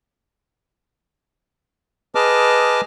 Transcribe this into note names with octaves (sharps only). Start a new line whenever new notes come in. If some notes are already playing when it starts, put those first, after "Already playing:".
G#4 B4 D#5 A5 D6 F6